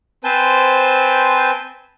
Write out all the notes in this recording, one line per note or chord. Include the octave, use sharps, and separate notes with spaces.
C4 B4 C5 G#5 A5 G6